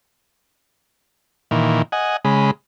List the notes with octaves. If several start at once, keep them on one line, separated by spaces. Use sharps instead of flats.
A#2 D#3 E3
D#5 F#5 G#5
C#3 G#3 B5